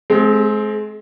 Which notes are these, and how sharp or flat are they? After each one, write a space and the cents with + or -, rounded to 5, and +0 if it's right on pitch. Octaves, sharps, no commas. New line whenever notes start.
G#3 +35 C4 +0